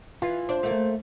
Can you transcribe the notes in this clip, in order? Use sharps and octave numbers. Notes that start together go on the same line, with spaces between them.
E3 F4
D4 C5
A3 A#3